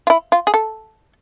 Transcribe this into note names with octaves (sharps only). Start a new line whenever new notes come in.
F4
E4
F4
G#4
A4